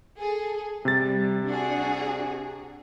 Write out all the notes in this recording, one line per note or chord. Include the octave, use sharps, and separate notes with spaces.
G#4 A4
C3 G3 A6
D4 F#4 G#4